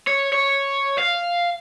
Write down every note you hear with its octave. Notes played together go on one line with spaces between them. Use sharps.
C#5
C#5
F5